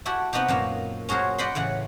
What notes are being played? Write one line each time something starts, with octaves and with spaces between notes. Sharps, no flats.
E4 F#4 G4 A4
C3 B3 D#4 F#4 G4
F#2 A#2 A#3
C#4 F#4 G#4 A#4 C5
D5 D#5 F#5 G5 B5 C6
A2 C#3 E3 F#5